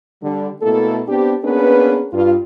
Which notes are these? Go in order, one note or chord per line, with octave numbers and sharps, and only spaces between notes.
D3 G3
B2 A3 A#3 E4 A4
B3 C4 D4 G4
A#3 B3 C#4 D4 G#4 B4
G2 F4